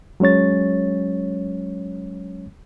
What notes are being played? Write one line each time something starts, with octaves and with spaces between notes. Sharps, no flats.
F#3 G#3 C#4 C#5 A6